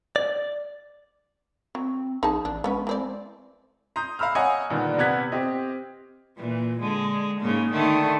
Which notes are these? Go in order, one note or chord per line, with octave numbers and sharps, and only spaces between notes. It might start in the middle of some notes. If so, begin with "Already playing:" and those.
D5
F#3 C4
A#1 D#4 G#4 A5
A1 D4
G#3 B3 C#4 B4
E3 C4 D5
A#5 C6 D#6 G6
F5 A#5 B5 E6 F6
C#5 D#5 F#5 G#5 A#5
G2 A#2 D3 D#3 G3 B3
C3 B3 F#6 G#6 B6
C4 G4 D#5
A#2 E3
D3 G#3
G#2 C#3 A#3
D3 D#3 A3